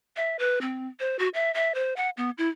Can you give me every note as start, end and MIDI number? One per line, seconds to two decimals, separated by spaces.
0.17 0.37 76
0.39 0.59 71
0.61 0.88 60
1.00 1.17 72
1.19 1.29 66
1.34 1.53 76
1.54 1.74 76
1.74 1.94 72
1.96 2.10 78
2.17 2.30 59
2.38 2.49 64